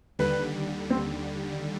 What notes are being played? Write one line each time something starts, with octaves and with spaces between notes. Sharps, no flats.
D#2 D3 G3 B4
C4